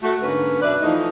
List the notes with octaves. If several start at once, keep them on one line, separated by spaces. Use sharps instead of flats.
A3 F#4
G#2 D3 A#3 C#4 B4
F#2 B2 D4 B4 D5 E5
E3 F3 A3 D#4